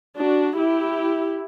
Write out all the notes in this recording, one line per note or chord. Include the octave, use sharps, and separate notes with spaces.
D4 F#4
E4 G4